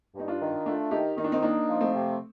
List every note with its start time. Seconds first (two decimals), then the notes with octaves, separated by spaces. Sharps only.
0.15 G2 D#4
0.28 D4 F4
0.41 D#3
0.66 A3 D4 F4
0.91 D#3 D#4 G4
1.17 D#3 D#4
1.24 D4
1.32 C4 D#4
1.43 A#3 D4 D#4
1.68 F3
1.81 A3 C4
1.94 C3